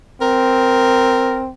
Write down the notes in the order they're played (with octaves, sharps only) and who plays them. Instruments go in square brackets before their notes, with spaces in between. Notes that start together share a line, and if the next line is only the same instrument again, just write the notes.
[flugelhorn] C4 [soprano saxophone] A#4